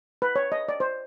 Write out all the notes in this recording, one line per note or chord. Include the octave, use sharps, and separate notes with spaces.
B4
C#5
D#5
D5
C5